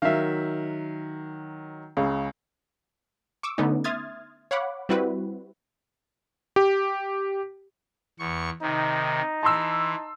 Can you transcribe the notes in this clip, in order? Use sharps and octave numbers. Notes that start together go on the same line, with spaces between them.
D#3 F#3 E5 F5
C#2 C#3
C#6 D6 E6
D3 A3 B3 C#4 D#4
E5 C6 D#6 F6 G#6 A6
C#5 F5 F#5 B5 D6
G3 C4 E4 F#4 B4
G4
E2 C#6
C3 D#3 D#4
E3 A5 C6 E6